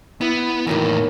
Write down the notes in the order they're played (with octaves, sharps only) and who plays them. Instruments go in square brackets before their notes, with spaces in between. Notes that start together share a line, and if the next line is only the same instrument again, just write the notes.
[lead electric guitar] B3 [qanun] E4
[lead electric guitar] E2 A2 [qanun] D#3 F#3 A#3